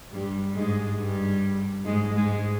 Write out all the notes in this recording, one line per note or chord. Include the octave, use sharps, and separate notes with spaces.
G2 G3
G#2 G#3
G2 G3
G#2 G#3
G#2 G#3